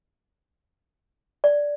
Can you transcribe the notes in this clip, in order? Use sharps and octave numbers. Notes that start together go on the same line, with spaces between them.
D5